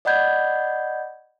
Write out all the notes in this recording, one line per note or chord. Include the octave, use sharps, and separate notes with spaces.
D5 D#5 F#5 B5 G6 G#6